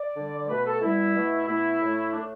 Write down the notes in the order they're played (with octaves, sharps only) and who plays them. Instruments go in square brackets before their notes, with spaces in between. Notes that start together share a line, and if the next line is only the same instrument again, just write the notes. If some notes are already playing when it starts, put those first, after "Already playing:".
Already playing: [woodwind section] D5
D3 G3
D5
B2 A3 B4
A4
B2 G3 E4
B2 A3
B2 A3 E4
A2 A3
A2 A3 D4